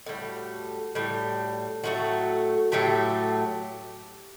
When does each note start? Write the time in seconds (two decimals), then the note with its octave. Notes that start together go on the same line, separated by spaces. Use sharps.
0.06 A2 G3 F#4
0.95 A2 G3
1.84 A2 F#3 A3 F#4
2.72 A2 F#3 A3 G4